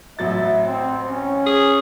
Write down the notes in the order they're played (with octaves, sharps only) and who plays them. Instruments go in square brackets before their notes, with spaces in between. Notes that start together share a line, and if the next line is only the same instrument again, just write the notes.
[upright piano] A1 F#3 A6 [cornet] E5
[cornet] C4
C#4
[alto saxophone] G#4